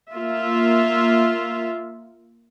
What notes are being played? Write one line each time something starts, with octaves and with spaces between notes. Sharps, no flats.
A#3 F4 E5